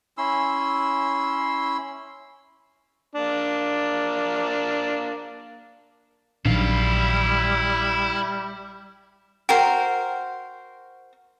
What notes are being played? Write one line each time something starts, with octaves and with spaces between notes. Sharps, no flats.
C#4 E4 C6 E6
A#3 D4
A#1 A#2 D#3 F#3 G3 D4 E4 F5
F#4 A#4 C5 G5